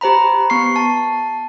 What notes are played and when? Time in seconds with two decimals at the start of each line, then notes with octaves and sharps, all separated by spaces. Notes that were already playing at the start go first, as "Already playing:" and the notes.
0.01 G4 C5 A#5 B5
0.50 B3 C#6 C7
0.76 A5